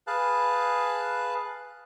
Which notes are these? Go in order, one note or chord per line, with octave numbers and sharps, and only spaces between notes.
G#4 B4 F5 A5 F#6